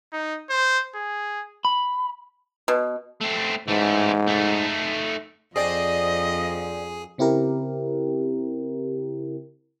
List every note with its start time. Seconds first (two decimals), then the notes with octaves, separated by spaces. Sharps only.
0.13 D#4
0.50 C5
0.95 G#4
1.65 B5
2.68 B2
3.21 A3 C4
3.68 G#2 E3 A3
4.27 A3 D#4
5.56 F2 C4 D4 G#4 D5 D#5
7.18 C#3 C4 E4 G4 A#4